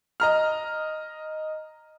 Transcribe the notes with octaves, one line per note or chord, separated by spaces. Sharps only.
D#5 A#5 F6